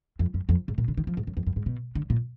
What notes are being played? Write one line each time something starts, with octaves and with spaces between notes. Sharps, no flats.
F2
F#2
F2
G#2
A#2
D3
D#3
F3
G#2
F#2
F2
F#2
G#2
B2
D3
A#2